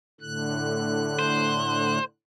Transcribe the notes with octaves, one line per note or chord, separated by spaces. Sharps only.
A2 D3 F#6
C5